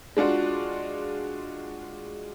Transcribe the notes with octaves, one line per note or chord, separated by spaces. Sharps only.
G#3 D4 F4 F#4